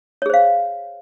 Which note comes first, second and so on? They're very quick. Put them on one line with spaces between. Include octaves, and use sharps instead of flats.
C#5 G#4 C5 F5